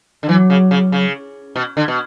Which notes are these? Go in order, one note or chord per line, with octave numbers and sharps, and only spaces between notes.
D3
E3 F#3
C#3
C#3
C#3
B2
D3
B2